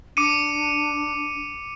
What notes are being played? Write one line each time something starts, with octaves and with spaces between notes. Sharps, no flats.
D4 D6 C#7 D#7